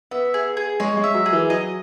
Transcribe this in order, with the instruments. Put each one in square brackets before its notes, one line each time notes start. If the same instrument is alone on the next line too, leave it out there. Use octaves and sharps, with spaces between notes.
[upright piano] B3 [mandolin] E5
[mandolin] G#4
G#4
[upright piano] G#3 [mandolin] C#5
[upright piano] G#3
[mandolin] E5
[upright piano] F#3
[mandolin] G#4
[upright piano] E3
[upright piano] F#3 [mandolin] D#5